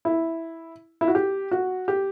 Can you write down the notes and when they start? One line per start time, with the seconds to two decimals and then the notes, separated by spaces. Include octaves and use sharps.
0.05 E4
1.01 E4
1.08 F#4
1.15 G4
1.51 F#4
1.88 G4